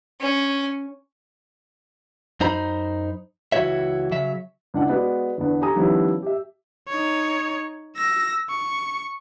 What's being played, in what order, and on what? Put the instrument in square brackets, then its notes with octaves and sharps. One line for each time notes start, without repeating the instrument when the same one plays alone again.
[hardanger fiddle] C#4
[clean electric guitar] F#2 D#4 C5 A#5 B5
C#2 E3 A3 F#4 C#5 E5
C#3 F#3 E5
[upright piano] C#2 D4 E4 F#5
G#3 B3 F#4 B4 D5
E2 D3 B3
G4 A4 G#5 A#5 D#6
D#3 F3 G3 B3 C#4 E4
G4 E5
[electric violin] D#4 C#5
E6 A#6
C#6